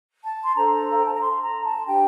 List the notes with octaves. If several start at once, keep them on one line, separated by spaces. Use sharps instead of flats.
A5
C6
D4 A4 C5 A#5
F5
G5
A5
A#5
C6
A#5
A5
D4 G4 C5 G5